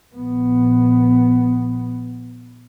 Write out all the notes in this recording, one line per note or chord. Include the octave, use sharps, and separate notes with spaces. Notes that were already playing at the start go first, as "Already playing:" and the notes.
A#1 B3